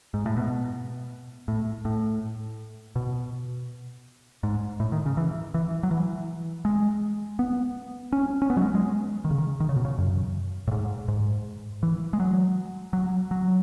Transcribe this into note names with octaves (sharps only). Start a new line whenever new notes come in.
G#2
A2
B2
A2
A2
B2
G#2
A2
D#3
C#3
E3
E3
F#3
E3
G#3
B3
C#4
C#4
B3
F#3
G#3
G#3
D#3
C#3
D#3
D#3
C#3
B2
C#3
F#2
A2
G#2
G#2
E3
G#3
F#3
F#3
F#3